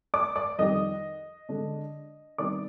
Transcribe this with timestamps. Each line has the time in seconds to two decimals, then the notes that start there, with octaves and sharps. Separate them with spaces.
0.14 D5 D6
0.36 D5 D6
0.59 F2 D#3 G3 D#5 D#6
1.49 D3 G#3 D4
2.38 C3 D#3 G3 B3 D5 D6